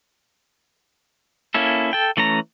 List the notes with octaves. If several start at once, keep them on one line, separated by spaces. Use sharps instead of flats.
A#3 C#4 E4 A4
A4 G5
E3 A3 C#4 A#5